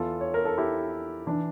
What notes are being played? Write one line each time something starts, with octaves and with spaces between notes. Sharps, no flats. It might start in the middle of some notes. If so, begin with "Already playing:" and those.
Already playing: E2 E3 F4 A4
C#5
A#4
A4
E4 G4
E3 D4